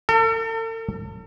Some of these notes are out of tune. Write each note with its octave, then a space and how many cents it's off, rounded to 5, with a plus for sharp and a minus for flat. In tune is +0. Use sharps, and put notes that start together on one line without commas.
A4 +45